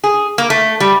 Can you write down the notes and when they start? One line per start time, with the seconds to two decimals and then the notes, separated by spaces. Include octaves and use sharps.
0.04 G#4
0.38 A#3
0.50 A3
0.80 G3